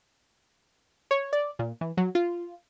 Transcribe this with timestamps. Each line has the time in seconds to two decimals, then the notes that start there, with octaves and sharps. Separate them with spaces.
1.11 C#5
1.33 D5
1.59 A#2
1.81 E3
1.97 F#3
2.15 F4